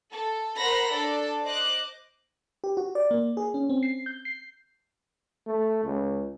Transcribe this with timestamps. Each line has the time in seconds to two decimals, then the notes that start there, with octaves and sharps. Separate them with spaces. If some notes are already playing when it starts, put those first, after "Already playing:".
0.11 A4
0.57 A#4 C5 F#5 A#5 B5 A#6
0.93 D4 A4 D5
1.42 C5 D#5 D6 F#6
2.64 G4
2.77 F#4
2.95 D5
3.11 A#3
3.37 G#4
3.54 C#4
3.69 C4
3.83 C7
4.06 G6
4.25 C7
5.47 A3
5.84 C#2